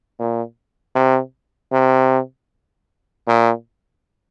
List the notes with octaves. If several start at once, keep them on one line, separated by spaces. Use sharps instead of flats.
A#2
C3
C3
A#2